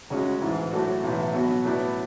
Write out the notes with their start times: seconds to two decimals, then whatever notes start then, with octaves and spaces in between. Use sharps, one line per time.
0.10 D2 C#3 G#3 C#4 F#4
0.42 A1 G#2 E3
0.71 A2 F#3 A3 D4 F#4
1.03 B1 A2 E3
1.34 B2 F#3 B3 F#4
1.65 A2 F#3 B3 D4